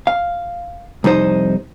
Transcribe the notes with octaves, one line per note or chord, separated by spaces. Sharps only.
F5
C2 F2 D#4 C5